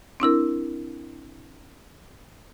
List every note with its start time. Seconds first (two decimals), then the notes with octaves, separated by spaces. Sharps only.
0.20 C4 D4 E4 A#4